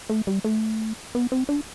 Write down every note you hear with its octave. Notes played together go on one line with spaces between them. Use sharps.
A3
G3
A3
B3
C4
D4